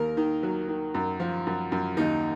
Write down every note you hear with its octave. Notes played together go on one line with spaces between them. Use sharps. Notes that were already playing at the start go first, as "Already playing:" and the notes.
Already playing: D#2 A#4
D#3
F#3
D#3
F#2
F3
F#2
F#2
D#2 D#4